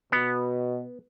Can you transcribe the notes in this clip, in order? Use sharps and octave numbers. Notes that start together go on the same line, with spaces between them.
B2 B3